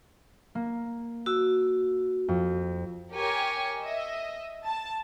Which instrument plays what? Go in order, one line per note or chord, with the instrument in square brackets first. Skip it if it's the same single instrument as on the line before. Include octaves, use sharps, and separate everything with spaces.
[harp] A#3
[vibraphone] F#4 [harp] E6
[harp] F2
[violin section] G4 A#4 C#5 G#5 C#6
D#5 E5
A5